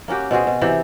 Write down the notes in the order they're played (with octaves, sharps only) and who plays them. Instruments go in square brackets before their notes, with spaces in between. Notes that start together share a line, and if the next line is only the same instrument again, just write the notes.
[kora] A#3 C#4 F#4 G4
B2 C4 F#4 G#4
B2
C3 E3 G4